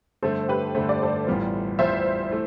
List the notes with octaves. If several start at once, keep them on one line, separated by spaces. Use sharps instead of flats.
G2 D3 A3 A4 C5
G4 B4
G2 D3 A3 C5
D5
A4 C5
A1 A2 G3 B3 F4
A1 A2 G3 B3 F4 C5 E5
E3 A3